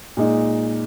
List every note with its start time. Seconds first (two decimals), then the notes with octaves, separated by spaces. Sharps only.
0.17 A#2 G#3 D#4